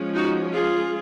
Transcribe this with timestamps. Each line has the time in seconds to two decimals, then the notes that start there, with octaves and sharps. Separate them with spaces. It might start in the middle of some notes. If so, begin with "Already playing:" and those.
Already playing: F3 G#3 C#4
0.14 D#4 F#4
0.52 F4 G#4